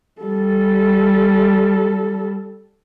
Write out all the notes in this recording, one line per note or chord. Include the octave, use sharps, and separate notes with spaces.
G3 A4